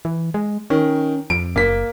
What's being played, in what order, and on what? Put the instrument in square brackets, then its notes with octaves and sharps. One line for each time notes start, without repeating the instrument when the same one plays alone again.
[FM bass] E3
G#3
[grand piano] D#3 [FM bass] C#4
[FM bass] F2 [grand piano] D7
[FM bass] F#1 [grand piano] A#3 B6